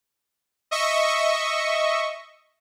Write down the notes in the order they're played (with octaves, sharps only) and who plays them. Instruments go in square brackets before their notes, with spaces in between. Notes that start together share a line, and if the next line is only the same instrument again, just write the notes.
[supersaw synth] D#5 E5 C#6